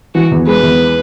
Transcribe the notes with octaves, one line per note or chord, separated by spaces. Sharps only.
E3 F#4
E2
G#3 B4
E2